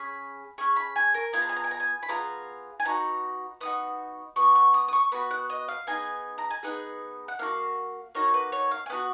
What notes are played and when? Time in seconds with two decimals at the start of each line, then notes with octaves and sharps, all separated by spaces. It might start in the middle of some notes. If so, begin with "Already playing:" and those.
Already playing: C#4 G#4 B5
0.58 C#4 G#4 C#6
0.76 B5
0.96 G#5
1.14 A#4
1.33 B3 F4 G#4 G#5
1.42 A#5
1.49 G#5
1.56 A#5
1.64 G#5
1.71 A#5
1.80 G#5
2.03 B5
2.09 B3 F4 G#4 A#5
2.80 G#5
2.85 B3 D#4 F#4 A#5
3.60 B3 D#4 F#4 D#6
4.36 B3 F#4 C#6
4.55 C#6
4.74 D#6
4.88 D#6
4.93 C#6
5.12 B3 F#4 B5
5.31 F#5
5.50 D#5
5.68 F5
5.87 B3 D#4 G#4 G#5
6.38 A#5
6.51 G#5
6.63 B3 D#4 G#4 F#5
7.28 F#5
7.39 A#3 D#4 F#4 F5
8.15 A#3 D#4 F#4 C#5
8.34 B4
8.52 C#5
8.71 F5
8.86 G#5
8.90 B3 D#4 F#4 F#5